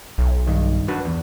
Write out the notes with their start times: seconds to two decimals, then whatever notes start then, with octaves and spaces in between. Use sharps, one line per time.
0.18 B1
0.47 G2 D#3
0.88 D4 F#4 B4
1.05 E2